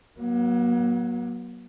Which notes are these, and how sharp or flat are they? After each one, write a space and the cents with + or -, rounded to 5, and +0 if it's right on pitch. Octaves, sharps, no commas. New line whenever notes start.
F#3 +0 A#3 +40